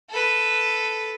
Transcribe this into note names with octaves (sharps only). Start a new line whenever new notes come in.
A4 B4